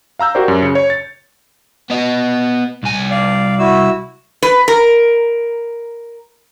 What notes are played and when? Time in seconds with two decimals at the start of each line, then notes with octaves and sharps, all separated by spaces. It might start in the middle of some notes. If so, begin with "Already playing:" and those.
0.19 F5 A#5 E6 G6
0.35 F#4 G4 A#4 C5 D5
0.48 F#2
0.62 C#3 C#7
0.75 C#5
0.90 A6
1.90 B3 D#5
2.83 C2 G#5
3.11 D5 F5
3.59 E4 F#4 E6
4.42 B4
4.68 A#4